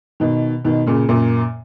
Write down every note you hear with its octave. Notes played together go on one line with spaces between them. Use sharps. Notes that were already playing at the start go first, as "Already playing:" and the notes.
B2 D#3
B2 D#3
A#2 C#3
F#2 A#2